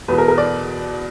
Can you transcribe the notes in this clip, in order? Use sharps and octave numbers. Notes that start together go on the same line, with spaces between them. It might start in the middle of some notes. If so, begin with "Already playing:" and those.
E2 B2 B4
A#4
A#4
D5